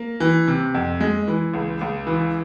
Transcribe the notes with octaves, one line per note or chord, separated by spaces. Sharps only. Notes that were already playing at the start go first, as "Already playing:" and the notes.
Already playing: A#3
E3
C3
F2
G#3
E3
C#2
C#2
E3